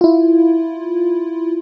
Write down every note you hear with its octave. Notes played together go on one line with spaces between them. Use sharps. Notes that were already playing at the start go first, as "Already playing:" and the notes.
E4 F4